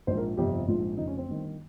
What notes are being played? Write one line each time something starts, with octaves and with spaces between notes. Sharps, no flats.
A#1 G#2 F3 C5
A#4
G1 F2 C3 G4
A#1 G#2 F3 F4
F1 F2 C#3 D#4
C#4
C4
G1 G2 D#3